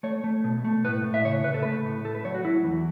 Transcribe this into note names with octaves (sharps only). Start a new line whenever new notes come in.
A3 C#5
A3
B2
A3
A2 B4
A2
E5
C#3 C#5
C#3 B4
A4
A3 B4
A2
A3 A4
B4
F#3 C#5
F#4
F#3 E4
E2